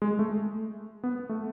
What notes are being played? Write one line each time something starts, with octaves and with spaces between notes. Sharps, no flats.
G#3
A3
B3
A3